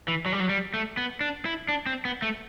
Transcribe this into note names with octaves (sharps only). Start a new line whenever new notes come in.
E3
F#3
G3
F#3
G3
A3
B3
D4
E4
D4
C4
B3
A3